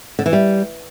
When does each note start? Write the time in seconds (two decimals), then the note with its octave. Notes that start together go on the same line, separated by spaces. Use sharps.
0.19 D3
0.26 E3
0.33 G3